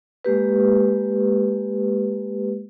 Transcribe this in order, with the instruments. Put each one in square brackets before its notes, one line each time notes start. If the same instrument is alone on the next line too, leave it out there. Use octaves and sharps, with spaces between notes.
[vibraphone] G#3 A#3 G4 B4